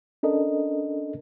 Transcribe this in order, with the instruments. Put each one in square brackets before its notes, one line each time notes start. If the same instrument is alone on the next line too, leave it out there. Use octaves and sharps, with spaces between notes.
[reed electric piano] C#4 D4 A4 A#4 D#5